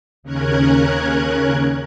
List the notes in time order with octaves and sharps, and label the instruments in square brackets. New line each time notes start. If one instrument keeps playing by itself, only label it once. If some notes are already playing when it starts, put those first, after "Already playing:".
[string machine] D#2 C#3 C#4 A#4 F#6 G#6